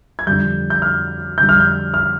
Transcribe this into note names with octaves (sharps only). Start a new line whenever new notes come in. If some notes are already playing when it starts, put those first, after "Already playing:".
G#6
F2 D3 G3 G6
G6
F6
F2 D3 G3 G6
F6
G6
F6